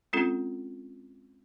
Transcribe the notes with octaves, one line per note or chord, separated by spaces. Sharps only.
G#3 C4 C#4 F4 A4